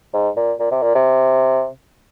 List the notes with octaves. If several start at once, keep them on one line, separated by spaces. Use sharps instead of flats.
G#2
A#2
A#2
C3
A#2
C3